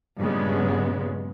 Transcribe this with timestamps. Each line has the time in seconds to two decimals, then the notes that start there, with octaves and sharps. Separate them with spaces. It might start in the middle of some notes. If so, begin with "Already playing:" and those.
0.20 G2 A#2 C#3 F#3 G#3 B3